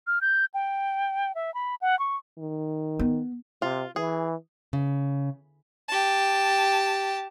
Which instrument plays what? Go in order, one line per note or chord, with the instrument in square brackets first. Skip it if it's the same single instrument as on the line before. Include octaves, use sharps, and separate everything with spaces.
[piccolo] F6
G6
G5
E5
B5
F#5
C#6
[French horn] D#3
[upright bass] B3
[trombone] C3 [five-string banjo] F4
[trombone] E3 [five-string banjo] G#4
[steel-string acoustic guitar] C#3
[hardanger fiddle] G4 A5